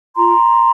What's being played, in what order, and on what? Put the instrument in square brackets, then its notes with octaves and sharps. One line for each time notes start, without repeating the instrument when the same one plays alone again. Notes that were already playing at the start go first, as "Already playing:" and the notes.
[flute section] F4 A#5 C6